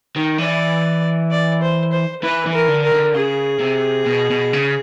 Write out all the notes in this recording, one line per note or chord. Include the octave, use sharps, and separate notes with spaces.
D#3
E3 D5
D5
C5
C5
E3 B4
E3
A#4
D3
A#4
D3
C#3 G#4
C3
B2
B2
C#3